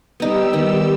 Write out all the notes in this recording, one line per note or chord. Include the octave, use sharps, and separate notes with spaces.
G3 B3 D#4 G4 E6
D#3 B3